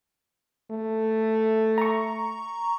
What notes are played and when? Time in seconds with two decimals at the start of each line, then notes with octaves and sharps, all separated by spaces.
0.71 A3
1.78 A#5 C#6